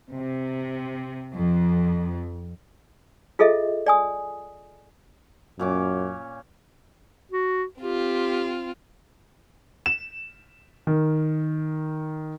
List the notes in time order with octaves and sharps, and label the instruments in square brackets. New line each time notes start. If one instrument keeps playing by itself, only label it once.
[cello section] C3
F2
[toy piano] F4 G#4 A4 D#5 E5
D5 G#5 D#6
[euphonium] F#2 [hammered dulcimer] A#2 C#4 D6
[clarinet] F#4
[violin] C4 F4 [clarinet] G4
[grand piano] E7
D#3